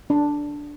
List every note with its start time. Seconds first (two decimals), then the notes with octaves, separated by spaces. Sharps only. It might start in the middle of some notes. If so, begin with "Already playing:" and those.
0.10 D4